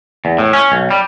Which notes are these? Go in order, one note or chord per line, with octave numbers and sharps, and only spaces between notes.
E2
A2
C#4
B1
G3